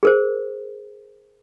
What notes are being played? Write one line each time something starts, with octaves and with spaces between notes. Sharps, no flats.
G#4 A#4 C5